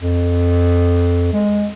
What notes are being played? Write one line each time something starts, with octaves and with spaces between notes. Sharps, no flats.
F2
G#3